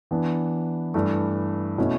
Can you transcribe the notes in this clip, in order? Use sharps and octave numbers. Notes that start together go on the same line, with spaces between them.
E3 B3 D4
G2 E3 A3 E4
B2 A3 C#4 E4